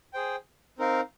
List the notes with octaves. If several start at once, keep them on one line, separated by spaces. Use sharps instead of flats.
G#4 C5 G5
C4 D#4 A#4 F5